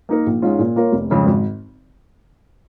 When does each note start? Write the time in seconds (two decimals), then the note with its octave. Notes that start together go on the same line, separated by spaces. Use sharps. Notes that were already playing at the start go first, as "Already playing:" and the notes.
0.09 A#3 D#4 A#4
0.26 A#1
0.42 G#2 G#3 C#4 F4
0.59 A#2
0.76 A#3 F4 A#4 C#5
0.92 F1
1.10 F2 C#3 G#3
1.26 G#1